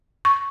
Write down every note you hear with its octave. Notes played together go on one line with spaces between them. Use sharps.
C#6